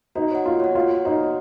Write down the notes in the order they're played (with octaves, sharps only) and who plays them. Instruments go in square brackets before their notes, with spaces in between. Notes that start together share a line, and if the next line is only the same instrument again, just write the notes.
[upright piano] D#4 [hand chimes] F#4
[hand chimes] C#5 F#5
[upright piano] F4 [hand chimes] F#4
[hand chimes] C#5 F#5
[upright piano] F4 [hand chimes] F#4
[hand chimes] C#5 F#5
[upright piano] D#4 [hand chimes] F#4
[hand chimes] C#5 F#5